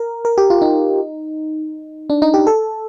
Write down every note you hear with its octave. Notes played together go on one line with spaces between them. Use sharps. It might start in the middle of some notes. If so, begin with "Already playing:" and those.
Already playing: A#4
A#4
G4
F4
D#4
D4
D#4
G4
A4